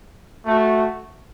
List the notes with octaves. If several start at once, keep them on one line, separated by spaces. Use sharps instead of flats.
A3 F#4